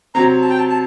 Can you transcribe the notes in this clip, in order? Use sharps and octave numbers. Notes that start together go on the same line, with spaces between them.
C3 F#3 C4 A#5
A5
G5
A5
A5